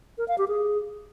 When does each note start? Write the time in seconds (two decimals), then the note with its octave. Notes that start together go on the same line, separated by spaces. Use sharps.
0.18 A#4
0.28 F5
0.38 G4
0.48 G#4